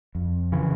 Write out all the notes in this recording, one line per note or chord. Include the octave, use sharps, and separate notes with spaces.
F2
C#3 E3